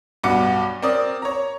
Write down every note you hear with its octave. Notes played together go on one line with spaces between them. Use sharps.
B1 G2 F#4 D6 C#7
C4 A#4 D5 D#6
C#5 A#5